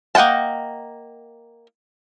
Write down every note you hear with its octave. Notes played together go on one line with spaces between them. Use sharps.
A#3 D#5 F#5 G5 A5